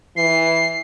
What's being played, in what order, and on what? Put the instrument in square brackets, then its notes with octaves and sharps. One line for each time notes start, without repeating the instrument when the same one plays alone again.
[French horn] E3 [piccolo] C7